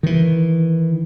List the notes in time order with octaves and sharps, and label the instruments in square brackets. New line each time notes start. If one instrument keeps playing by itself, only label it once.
[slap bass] D#3 E3